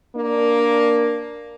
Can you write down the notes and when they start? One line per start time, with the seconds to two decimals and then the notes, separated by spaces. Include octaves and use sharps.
0.16 A#3 D4